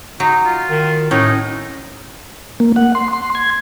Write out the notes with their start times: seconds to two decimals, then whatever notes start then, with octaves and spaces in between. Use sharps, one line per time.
0.20 F#3 D#4
0.45 F4
0.70 D#3
1.11 A2 C#4 D#4
2.60 A#3
2.76 F#5
2.95 C6
3.13 C6
3.35 G#6